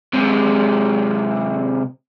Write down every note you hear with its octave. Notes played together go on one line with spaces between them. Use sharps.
C3 G#3